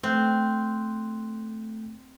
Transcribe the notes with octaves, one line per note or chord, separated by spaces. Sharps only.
A3 C4 F#6 G6